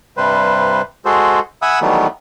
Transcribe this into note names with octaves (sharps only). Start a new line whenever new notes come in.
G2 C3 G3 B4 C5
G#3 F#4 G#4 A4 C5
E5 F#5 G#5 B5 D#6 E6
D#3 E3 F#3 G3 A3 B3